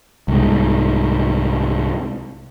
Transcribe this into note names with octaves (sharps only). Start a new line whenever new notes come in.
C2 G#2